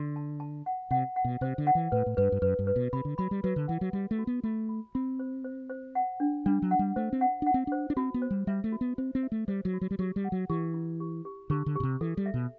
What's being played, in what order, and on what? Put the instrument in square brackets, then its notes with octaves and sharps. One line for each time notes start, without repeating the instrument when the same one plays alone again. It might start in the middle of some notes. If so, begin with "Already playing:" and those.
Already playing: [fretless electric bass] D3 [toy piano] C6
[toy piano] A5
A5
F#5
[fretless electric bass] C3 [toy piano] F#5
[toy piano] F#5
[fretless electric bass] B2
[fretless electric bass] C3 [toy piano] C5
[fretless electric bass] D3
[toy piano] F#5
[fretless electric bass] E3
[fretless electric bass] A2 [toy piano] B4
[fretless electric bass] A2
[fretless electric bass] G2 [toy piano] B4
[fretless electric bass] G2
[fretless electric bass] F#2 [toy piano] B4
[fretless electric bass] G2
[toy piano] B4
[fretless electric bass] B2
[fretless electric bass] C3 [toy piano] B5
[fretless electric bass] D3
[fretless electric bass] F#3 [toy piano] B5
[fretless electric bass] G3
[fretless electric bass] F#3 [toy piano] B4
[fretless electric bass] D3
[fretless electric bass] E3 [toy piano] F#5
[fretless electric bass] F#3
[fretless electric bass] G3 [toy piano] F#4
[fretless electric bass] A3
[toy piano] F#4
[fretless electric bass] B3
[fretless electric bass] A3 [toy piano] B5
[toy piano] B5
[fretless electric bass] C4 [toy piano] B5
[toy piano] C5
C5
C5
F#5
D4
[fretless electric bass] G3 [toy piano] D4
[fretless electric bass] F#3
[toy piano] F#5
[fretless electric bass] G3
[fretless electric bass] A3 [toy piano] C5
[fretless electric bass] C4
[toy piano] F#5
[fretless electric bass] D4 [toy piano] F#5
[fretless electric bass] C4
[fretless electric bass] D4 [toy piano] C5
[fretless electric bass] D4
[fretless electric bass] C4 [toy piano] F#4
[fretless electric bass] B3
[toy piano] C5
[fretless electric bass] G3
[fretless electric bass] G3 [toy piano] E5
[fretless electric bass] A3
[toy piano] F#4
[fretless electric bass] B3
[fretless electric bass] C4 [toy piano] C5
[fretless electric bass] C4
[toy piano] E5
[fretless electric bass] A3
[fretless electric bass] G3 [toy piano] C5
[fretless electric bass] F#3
[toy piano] F#4
[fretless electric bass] F#3
G3
[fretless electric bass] F#3 [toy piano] G4
[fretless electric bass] G3
[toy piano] F#5
[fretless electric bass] F#3
[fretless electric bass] E3 [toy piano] G4
[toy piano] E4
G4
G4
[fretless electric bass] D3 [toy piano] G4
[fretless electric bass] D3
[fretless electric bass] B2 [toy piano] G4
[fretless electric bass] C3
[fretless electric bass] E3 [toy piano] A4
[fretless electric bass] G3
[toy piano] E5
[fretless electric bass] B2